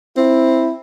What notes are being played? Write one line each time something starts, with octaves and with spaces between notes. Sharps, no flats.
C4 E4